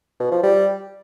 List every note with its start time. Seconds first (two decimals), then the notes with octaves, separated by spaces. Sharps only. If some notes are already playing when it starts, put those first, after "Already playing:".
0.20 B2
0.32 F3
0.43 G3